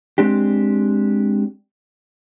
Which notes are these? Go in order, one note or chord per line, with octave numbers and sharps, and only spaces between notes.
G#3 C4 D4 G4